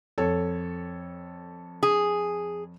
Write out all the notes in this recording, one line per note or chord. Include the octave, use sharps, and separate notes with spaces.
F2 A4 C#5
G#4